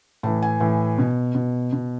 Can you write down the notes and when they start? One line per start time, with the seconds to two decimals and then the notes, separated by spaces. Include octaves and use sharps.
0.23 A2 E3 A5
0.42 G#5
0.60 A2 E3
0.98 B2
1.35 B2
1.73 B2